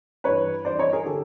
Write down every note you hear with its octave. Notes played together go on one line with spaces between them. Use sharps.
G2 E3 B4 C#5
G2 E3 C5 D5
C#5 D#5
G#4 A#4
D3 G4 A4